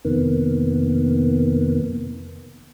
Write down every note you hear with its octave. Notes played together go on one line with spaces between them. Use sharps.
F2 C3 D#3 A#3 B3